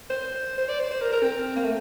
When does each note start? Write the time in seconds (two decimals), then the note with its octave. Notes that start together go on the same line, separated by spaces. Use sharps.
0.10 C5
0.58 C5
0.69 D5
0.80 C5
0.91 C5
1.02 A#4
1.13 A#4
1.23 C4
1.56 A#3
1.64 A3